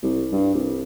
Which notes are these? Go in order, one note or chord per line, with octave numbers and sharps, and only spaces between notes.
C2
G2
C2